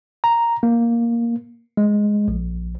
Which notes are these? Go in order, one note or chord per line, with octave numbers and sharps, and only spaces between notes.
A#5
A#3
G#3
A#1